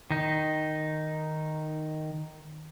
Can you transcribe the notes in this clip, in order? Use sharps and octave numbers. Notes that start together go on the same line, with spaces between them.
D#3 D#4